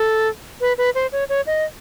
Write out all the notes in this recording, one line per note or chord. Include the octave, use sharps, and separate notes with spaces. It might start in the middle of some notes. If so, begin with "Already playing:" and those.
Already playing: A4
B4
B4
C5
C#5
C#5
D#5